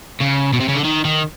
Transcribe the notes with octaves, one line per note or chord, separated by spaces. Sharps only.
C#3
B2
C3
C#3
D3
D#3
D#3